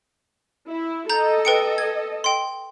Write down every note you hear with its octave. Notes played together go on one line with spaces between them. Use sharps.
E4
A4 D#5 A#5 G6
B4 G5 C#7
G#6
G5 C6